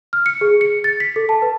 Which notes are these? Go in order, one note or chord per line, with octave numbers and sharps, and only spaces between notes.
F6
C#7
G#4
C#7
A6
B6
A4
A5
B4